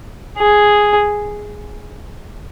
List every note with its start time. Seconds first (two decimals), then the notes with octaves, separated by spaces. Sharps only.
0.38 G#4